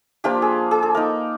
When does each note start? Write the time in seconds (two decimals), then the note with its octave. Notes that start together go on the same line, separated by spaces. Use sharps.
0.24 F3 A#3 D4 F4 G4
0.42 G#4
0.71 G#4
0.83 A4
0.94 A#3 D#4 A#4